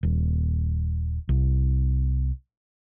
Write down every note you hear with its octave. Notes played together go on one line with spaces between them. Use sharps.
D#1
C2